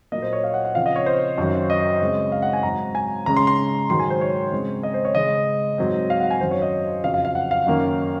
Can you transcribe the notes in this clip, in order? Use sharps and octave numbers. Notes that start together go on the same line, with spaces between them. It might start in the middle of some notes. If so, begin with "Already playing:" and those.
A#2 F#3 A#3 D#5
C5
C#5
F5
F#5
F#5
C#3 F3 C4 F5
D#5
C#5
C5
F#2 D#3 F#3
D#5
C#3 G#3 C4
F5
F#5
G#5
G#2 F#3 C4 A#5
G#5
C#3 G#3 C#4 A#5
C6
C6
G#2 D#3 F#3 C6
G#5
C5
C#5
C#3 G#3 C4
D#5
C5
C#5
C#3 G#3 C#4 D#5
G#2 F#3 C4
F5
F#5
G#5
F#2 D#3 F#3 C5
C#5
D#5
F2 C#3 F#3 F5
F5
F5
F#5
F5
F#2 D#3 A#3 C#4